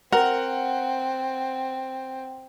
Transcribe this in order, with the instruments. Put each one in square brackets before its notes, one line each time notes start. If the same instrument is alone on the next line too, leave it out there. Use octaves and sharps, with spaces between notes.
[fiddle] C4 [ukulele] A#4 [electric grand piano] F#5